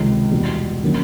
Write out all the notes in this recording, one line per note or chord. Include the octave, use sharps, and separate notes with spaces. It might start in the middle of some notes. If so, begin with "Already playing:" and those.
Already playing: C#2 C3 D#3
E2 B2 G3
D#3 F#3 A#3 C#4